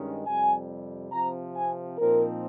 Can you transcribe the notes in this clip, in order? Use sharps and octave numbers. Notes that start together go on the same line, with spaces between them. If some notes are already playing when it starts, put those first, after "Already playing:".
Already playing: G2 D#3 G#3 C#4
F2 C3 G3 G#5
C3 F3 C4 A#5
G#5
A#2 F3 C4 D#4 A#4